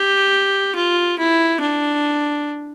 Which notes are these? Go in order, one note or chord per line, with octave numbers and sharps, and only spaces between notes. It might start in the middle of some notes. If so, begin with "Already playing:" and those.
Already playing: G4
F4
E4
D4